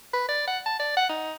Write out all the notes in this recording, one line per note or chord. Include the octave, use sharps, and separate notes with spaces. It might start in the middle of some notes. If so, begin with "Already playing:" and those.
B4
D5
F#5
A5
D5
F#5
D#4